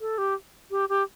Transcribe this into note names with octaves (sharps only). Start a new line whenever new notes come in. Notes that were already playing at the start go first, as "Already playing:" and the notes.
A4
G4
G4
G4